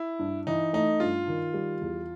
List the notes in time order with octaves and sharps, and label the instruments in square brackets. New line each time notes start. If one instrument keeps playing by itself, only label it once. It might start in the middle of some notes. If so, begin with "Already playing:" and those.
Already playing: [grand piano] E4
[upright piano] G2
[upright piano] E3 [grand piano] D#4
[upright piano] A3 [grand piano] D#4
[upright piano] G2 [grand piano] F4
[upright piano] D#3
G3
E2